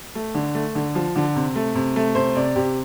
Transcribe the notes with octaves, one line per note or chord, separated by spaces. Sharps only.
A3
D3
A3
D3
F3
D3
C3
A3
C3
A3
C3 C5
C3 D5
C3 G4